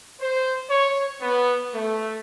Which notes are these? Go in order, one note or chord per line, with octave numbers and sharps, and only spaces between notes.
C5
C#5
B3
A3